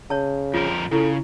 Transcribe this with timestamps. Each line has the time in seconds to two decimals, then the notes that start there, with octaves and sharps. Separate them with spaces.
0.10 C#3 C#5 A5
0.54 F2 G3 F4 A#4
0.92 C#3 E4 A4